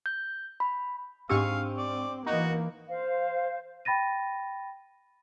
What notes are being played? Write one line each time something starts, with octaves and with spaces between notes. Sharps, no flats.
G6
B5
G#2 C4 D4 G4 F5 C#6 E6 D#7
D5
E3 A#3 D#4 F#4
C5 F5
G5 B5 A6 A#6 D#7